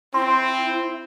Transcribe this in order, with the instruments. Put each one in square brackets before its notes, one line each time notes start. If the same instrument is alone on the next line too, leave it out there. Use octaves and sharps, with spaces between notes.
[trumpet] C4 [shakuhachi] E4 [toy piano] C6